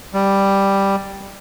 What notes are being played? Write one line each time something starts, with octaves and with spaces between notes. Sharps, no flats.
G3